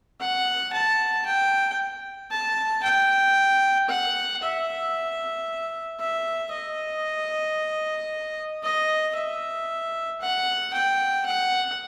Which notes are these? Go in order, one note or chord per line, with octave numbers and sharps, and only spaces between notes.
F#5
A5
G5
A5
G5
F#5
E5
E5
D#5
D#5
E5
F#5
G5
F#5